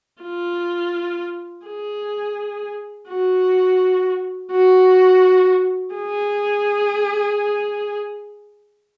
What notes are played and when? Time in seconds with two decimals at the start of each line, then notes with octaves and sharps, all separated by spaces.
0.23 F4
1.66 G#4
3.09 F#4
4.51 F#4
5.94 G#4